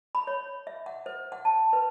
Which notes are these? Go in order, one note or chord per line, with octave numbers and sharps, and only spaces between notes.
B5
C#5
E5
F#5
C5
F#5
A5
B4